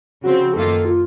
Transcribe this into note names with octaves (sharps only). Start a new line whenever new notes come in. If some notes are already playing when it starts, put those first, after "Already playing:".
C#3 F3 C4 F#4
F#2 D#3 A#3 F4 A4
F4